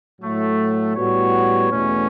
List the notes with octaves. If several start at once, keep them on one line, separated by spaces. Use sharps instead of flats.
A2 F#3 A3
A2 G3 B3 F#4 C#5
E2 B2 A3 C#4